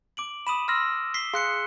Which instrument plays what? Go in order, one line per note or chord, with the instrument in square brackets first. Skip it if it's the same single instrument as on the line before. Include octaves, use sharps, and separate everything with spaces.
[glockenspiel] D6 D7 F#7
[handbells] B5 [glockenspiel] D#6 D#7 E7
[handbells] C6 F6 A#6 [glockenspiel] E6
[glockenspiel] B6 C7 G7
[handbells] G#4 F5 [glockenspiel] C6 F#6 C#7